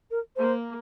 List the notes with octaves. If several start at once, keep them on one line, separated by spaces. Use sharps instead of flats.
A#4
A#3 C5